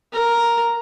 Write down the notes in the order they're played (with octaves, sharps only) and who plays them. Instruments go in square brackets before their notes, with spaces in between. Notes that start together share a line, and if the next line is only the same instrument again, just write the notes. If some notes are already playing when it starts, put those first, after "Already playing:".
[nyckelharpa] A#4 A#5